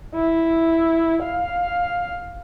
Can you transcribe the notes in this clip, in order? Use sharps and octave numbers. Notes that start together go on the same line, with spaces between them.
E4
F5